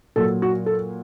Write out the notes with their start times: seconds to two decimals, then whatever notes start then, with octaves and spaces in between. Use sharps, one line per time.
0.16 A#2 F#3 A4
0.42 F#4
0.66 A4